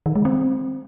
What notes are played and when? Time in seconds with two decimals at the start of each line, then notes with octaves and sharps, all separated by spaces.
0.06 D#3
0.15 G#3
0.25 C4